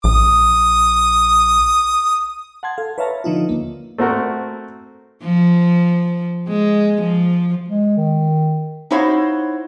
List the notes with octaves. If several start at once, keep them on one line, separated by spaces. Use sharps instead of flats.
A#1 D#6
F#5 A5 C6 G#6
A4 F5
B4 C#5 E5 F5 A5 A#5
D3 F3 D#4 F4
D#2 A#3
A3 C4 F#4 A#4
F3
G#3
F3
G#3
D#3
D#4 E4 F#4 C5 C#5 F5